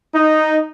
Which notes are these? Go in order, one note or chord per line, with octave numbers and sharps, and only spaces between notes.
D#4